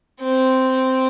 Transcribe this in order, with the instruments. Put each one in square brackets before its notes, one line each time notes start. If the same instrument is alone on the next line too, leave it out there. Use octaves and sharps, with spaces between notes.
[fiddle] C4